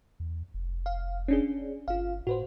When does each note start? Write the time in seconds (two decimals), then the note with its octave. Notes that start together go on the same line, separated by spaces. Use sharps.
0.20 E2
0.54 F1
0.86 F5
1.28 C#4 D4 G#4
1.88 G1 F4 F5
2.27 A2 F#4 B4 C5